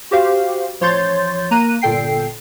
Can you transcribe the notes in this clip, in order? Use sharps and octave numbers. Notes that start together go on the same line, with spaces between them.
F#4 G4 C5 F5
A1 F3 C#5 C6 G6 A6
A#3 A#5 F#6 D#7
G1 A#2 A4 G5 C7